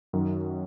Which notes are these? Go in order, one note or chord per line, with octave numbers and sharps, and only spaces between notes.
F#2 D#3 F#3